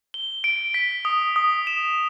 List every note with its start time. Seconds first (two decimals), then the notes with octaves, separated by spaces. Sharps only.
0.14 G7
0.44 D7
0.74 B6
1.05 D#6
1.36 D#6
1.67 E7